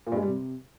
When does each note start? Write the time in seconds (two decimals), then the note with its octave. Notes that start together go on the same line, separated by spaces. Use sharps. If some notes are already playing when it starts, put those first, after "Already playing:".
0.07 A#2
0.12 G2
0.17 G#3
0.22 G3
0.28 C3